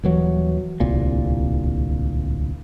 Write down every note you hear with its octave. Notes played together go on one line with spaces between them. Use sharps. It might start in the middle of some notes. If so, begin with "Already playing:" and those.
D#1 E3 F#3
D1 C2 A#2